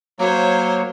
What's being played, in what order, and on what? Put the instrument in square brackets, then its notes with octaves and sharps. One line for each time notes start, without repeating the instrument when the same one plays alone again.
[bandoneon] F#3 A#3 [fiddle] C5 C#5